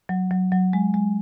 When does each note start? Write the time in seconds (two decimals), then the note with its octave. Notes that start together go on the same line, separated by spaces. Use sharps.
0.09 F#3
0.31 F#3
0.52 F#3
0.73 G#3
0.94 G#3